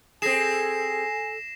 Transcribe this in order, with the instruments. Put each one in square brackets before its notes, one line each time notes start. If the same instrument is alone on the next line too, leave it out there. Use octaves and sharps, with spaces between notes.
[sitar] C4 G#4 [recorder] A4 [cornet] G#5 [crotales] A#6 C7 E7